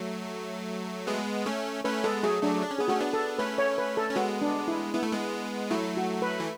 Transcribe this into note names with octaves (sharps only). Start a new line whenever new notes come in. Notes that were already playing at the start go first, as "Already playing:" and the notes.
Already playing: F#3 A3
G#3 B3
A3 C#4
A3 C#4 B4
G#3 B3 A4
F#3 A3 G#4
F#3 A3 D4
D4
C#4
B3 G#4
A3 C#4 F#4
B3 D4
A4
A3 C#4 B4
C#5
B4
A4
C#4
G#3 B3 F#4
D4
E4
B3 E4
A3
G#3 B3
F#3 A3 E4
F#4
B4
E3